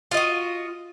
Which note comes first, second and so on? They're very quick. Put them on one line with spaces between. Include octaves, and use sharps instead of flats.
F4 D#5 F#4